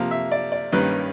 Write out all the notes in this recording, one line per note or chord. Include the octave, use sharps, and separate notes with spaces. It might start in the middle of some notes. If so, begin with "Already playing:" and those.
Already playing: C3 F3 A#3 F5
E5
D5
D5
G2 D#3 G3 A#3 C#4 B4